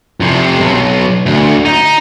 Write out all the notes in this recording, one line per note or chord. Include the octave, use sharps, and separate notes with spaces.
F2 C3
B1
D2
D#4